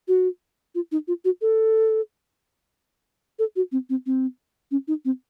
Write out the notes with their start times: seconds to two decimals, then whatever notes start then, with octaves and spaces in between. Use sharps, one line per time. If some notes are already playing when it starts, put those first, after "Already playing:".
0.08 F#4
0.75 F4
0.92 D#4
1.08 F4
1.25 F#4
1.42 A4
3.39 A4
3.56 F#4
3.72 C4
3.90 C4
4.06 C4
4.71 C#4
4.88 D#4
5.05 C4